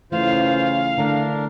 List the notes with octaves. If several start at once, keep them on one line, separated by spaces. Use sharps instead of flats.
C#3 E3 A3 F4 C5 F5
D3 A3 D4 A#4